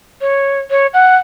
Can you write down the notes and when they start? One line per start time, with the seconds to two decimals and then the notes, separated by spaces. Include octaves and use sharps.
0.21 C#5
0.71 C#5
0.94 F#5